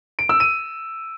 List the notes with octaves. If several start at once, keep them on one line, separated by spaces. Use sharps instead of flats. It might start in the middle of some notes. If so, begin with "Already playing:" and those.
D7
E6
D#7